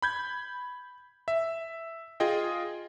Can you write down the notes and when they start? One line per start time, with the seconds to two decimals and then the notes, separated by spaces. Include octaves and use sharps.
0.02 B5 G6 G#6
1.28 E5
2.20 F4 G#4 D#5 G5